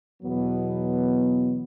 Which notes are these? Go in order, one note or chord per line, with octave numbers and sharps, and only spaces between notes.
E2 B2 F#3 B3